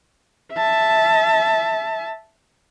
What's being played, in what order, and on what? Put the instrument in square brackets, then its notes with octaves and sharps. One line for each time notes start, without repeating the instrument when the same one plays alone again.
[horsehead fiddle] E5 A5